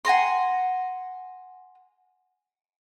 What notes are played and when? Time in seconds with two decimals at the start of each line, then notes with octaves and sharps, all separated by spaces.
0.05 F#5 G#5 A#5 C6